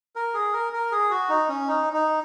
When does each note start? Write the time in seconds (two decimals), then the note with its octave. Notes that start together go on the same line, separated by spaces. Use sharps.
0.16 A#4
0.34 G#4
0.53 A#4
0.73 A#4
0.92 G#4
1.10 F#4
1.29 D#4
1.49 C#4
1.68 D#4
1.93 D#4